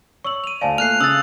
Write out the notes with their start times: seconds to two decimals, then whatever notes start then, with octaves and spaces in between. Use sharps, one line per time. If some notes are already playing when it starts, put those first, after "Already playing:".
0.24 C#5 C#6 E6 F#7
0.44 D#7 F7
0.61 D2 C5 D5 F5 G#5 A5
0.78 A#2 A3 F6 F#6 C7 F7
1.00 C#3 D#6 E6 A6